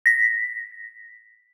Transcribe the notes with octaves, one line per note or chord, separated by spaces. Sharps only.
A#6 B6